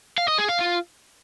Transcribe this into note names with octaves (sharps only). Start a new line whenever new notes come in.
F5
D#5
G#4
F5
F4